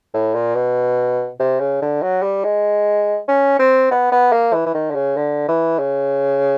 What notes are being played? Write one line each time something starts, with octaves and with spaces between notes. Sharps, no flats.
A2
A#2
B2
C3
C#3
D3
F#3
G3
G#3
C#4
C4
B3
B3
A#3
E3
E3
D#3
D3
C#3
D3
E3
C#3